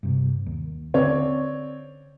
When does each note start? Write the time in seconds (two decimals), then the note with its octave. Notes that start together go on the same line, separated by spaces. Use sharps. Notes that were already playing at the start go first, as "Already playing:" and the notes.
0.03 G2 C3
0.46 D#2
0.94 D3 C4 C#5 D5